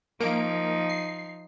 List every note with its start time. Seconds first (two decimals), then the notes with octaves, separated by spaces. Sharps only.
0.21 F3 A#3 D#4 D7
0.90 C7